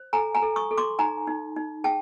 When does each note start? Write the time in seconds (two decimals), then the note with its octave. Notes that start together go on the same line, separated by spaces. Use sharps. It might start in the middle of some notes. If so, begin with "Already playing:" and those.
Already playing: C5
0.13 A4 G#5 A#5
0.35 G#5 A#5
0.42 A4
0.56 C#6 D#6
0.71 A4
0.78 C6 D6
0.99 D#4 G#5 A#5
1.27 D#4
1.56 D#4
1.84 G#4 G5 A5